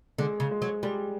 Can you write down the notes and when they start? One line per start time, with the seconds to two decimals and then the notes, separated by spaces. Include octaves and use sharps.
0.18 D3 G#3
0.40 C#3
0.51 G#3
0.62 F#3
0.83 G3 G#3